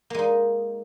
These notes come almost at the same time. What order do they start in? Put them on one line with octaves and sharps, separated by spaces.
A#3 G#3 D#4